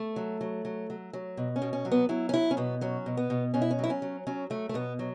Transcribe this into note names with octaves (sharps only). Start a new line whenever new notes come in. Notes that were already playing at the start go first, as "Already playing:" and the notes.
Already playing: A3
F#3
F#3
F#3
F#3
F#3
B2
C#4
B2
C#4
F#3
B3
F#3 E4
C#4
F#3 E4
C#4
B2 B3
F#3 C#4
B2
B3
B2
B2 C#4
E4
C#4
F#3 E4
C#4
F#3
F#3 C#4
F#3 A3
A3
B2 B3
F#3